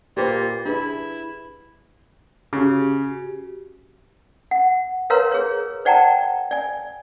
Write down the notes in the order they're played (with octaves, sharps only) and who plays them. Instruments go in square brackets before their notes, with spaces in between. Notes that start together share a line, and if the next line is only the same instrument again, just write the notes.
[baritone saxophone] A#2 [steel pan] G4 B4 C5
[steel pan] D4 G#4 B4 [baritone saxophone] E4
[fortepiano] C#3 [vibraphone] F#4 G4
[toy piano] F#5
A#4 B4 C#5 F5 A#5 C6
G#4 C#5
C5 D5 F#5 G5 A5 A#5
D5 G#5